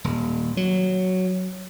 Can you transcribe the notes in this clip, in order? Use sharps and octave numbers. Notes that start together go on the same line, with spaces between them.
D#1
F#3